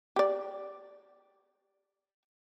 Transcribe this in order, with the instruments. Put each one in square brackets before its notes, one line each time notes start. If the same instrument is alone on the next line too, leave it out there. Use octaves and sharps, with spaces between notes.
[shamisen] G4 D5